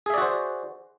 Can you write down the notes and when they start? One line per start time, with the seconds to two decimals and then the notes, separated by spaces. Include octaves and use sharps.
0.06 G#4
0.10 E5
0.14 D5
0.18 F#4
0.21 C5